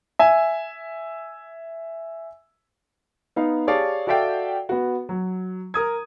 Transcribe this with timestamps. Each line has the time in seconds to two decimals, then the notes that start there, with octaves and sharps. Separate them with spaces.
0.19 E5 G#5
3.36 B3 D#4 F5
3.67 G4 G#4 C#5 D5 F5 A5
4.07 F#4 A4 D5 E5 F5 G5
4.69 B3 F#4
5.09 F#3
5.74 A#4 D#6 G#6